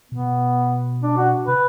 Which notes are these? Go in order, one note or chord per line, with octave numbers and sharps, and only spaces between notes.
B2 B3
D4
F#4
C3 B4